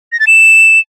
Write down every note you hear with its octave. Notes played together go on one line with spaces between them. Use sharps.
A#6
A6
E7